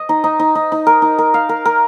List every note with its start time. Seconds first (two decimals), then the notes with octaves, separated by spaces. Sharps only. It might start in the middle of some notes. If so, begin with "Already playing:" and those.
Already playing: D#5
0.09 D#4
0.24 D#4
0.39 D#4
0.55 D#4
0.72 D#4
0.87 A#4
1.02 D#4
1.18 A#4
1.34 F5
1.49 A#4
1.65 A#4